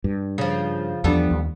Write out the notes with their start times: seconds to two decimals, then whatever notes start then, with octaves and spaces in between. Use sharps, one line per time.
0.04 G2
0.38 C#3 F3
1.04 E2 F3 G3 B3 D4 A4
1.31 D#2